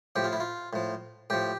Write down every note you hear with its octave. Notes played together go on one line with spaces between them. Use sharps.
A2 F3 G4
F4
E4
F4
A2 F3
A2 F3 G4